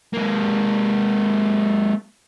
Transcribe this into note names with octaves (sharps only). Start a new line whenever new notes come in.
G#3 A#3